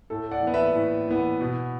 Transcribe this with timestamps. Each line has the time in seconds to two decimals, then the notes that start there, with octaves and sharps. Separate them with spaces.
0.10 A2 A4
0.31 D5 F#5
0.43 E3 B3
0.54 B4 E5
0.75 A2
1.08 E3 B3
1.41 B2